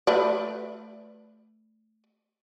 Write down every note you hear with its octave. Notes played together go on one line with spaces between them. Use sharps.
A3 B4 D5